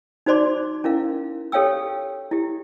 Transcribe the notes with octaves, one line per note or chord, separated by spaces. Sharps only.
D#4 F#4 C5 D5 C6 D6
C#4 E4 A#4 F5
G4 A4 C#5 F5 G5 E6
E4 G4